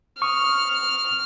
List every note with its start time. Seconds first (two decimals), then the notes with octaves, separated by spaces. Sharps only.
0.22 C#6 D#6 F6